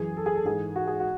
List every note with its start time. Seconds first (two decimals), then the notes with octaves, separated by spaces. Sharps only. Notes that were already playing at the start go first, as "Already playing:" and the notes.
Already playing: F#2 E3 G#4
0.17 A4
0.26 G#4
0.36 A4
0.45 G#2 E3 G#4
0.76 F#4
0.87 G#4
1.00 F#4